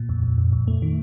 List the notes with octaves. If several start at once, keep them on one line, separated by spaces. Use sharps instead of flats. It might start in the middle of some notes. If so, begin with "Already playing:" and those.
Already playing: A#2
F2
F2
F2
F2
A3
D#3